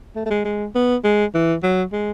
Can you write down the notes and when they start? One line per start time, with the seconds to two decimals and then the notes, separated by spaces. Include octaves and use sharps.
0.15 A3
0.26 A3
0.30 G#3
0.45 G#3
0.75 B3
1.04 G#3
1.34 E3
1.63 F#3
1.92 G#3